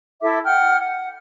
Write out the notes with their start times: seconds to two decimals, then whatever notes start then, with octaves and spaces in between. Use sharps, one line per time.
0.22 E4 A4 E5 D6
0.44 F#5 G5 F6
0.79 F#5